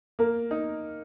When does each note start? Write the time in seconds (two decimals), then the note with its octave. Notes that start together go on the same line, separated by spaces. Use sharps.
0.19 A#3 A#4
0.51 D#4